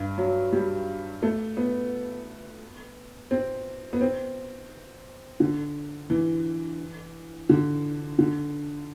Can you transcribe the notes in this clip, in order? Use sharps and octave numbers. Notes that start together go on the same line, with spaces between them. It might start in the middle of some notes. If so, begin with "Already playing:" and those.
Already playing: G2
F#3
G3
A3
B3
C4
B3
C4
D3
E3
D3
D3